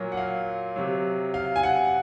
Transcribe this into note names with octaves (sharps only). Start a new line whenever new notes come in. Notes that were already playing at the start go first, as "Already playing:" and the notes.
Already playing: A#2 F#3
F#5
F5
C3 F#3
F5
G#5
F#5